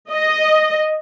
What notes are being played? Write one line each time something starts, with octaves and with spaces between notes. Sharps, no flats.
D#5